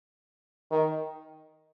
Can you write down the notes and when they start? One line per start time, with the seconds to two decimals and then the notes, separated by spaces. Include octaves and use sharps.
0.71 D#3